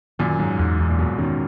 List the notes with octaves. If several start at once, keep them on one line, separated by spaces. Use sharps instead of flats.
F#2 A#2 D#3
G#2 F#3
E2 G#2
E2 G#2
A#2
G#2 B2 F#3
B2 D#3 C#4